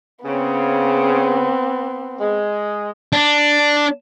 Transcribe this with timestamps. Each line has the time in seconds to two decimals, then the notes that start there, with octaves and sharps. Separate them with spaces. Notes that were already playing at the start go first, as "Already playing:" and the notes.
0.25 C#3 B3 C4
2.21 G#3
3.13 D4